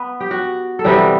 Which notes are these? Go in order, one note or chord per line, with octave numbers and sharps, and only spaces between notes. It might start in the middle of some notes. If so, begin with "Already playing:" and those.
Already playing: B3 B4
G4
F#4
A4
C3 E3 G3 B3 E4 G4